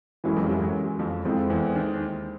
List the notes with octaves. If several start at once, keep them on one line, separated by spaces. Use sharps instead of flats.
F#2 E3 F#3 G#3 C#4 E4 A4
F2 F3
G3
F#2 F#3
F#2 F#3
F2 F3
F2 F3 G#3 C4 E4 A4
E2 E3
D#2 D#3